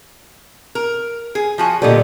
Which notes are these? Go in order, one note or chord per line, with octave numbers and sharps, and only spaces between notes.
A#4
G#4
F3 F#4 G#5
A#2 D3 G3 B3 D#5